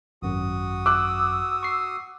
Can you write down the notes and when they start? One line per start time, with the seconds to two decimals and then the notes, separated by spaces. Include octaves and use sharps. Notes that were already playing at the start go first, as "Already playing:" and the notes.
0.22 G#1 F#2 F#4 D#6
0.86 D6 E6 F#6
1.63 C#6 C7